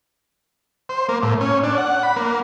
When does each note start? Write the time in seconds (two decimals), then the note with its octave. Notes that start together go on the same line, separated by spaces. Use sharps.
0.89 C5
1.09 A#3
1.23 A2
1.41 C#4
1.64 D4
1.78 F#5
2.03 B5
2.16 A#3